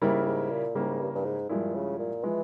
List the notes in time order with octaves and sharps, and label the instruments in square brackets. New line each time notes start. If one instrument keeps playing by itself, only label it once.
[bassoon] G#2 [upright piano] C#3 G3 A#3 E4 A#4
[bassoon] G#2
A#2
[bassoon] G#2 [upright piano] C#3 G3 A#3 E4 A#4
[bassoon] G2
G2
G#2
[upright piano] G2 F3 G#3 E4 [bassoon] A#2
[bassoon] C#3
A#2
[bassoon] E3 [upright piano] F3 G#3 E4